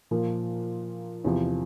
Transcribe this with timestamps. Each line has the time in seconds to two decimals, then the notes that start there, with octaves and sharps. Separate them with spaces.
0.11 A#2 F3 A#3
1.24 E2 C3 F3